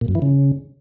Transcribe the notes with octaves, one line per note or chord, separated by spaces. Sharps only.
A#2
F#2
E3
C#3